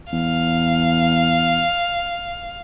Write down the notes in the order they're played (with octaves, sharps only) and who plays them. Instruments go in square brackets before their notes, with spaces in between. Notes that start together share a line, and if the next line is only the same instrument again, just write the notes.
[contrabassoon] E2 [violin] F5